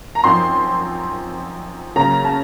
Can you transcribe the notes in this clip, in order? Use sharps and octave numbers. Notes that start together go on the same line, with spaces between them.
A#5
F#2 F3 C4 D#4 C6
C#3 F#3 A#3 A#5
A5